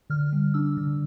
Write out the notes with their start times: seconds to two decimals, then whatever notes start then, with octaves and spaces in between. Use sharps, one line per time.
0.10 D3 F6
0.33 G3
0.54 D4 E6
0.77 D3